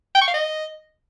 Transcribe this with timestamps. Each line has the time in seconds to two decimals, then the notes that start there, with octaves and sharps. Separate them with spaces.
0.15 G5
0.22 C#6
0.28 F5
0.34 D#5